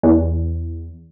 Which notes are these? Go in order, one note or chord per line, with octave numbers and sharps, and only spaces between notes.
E2